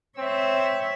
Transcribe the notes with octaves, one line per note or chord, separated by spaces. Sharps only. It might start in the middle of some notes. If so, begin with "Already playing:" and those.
C4 C#5 E5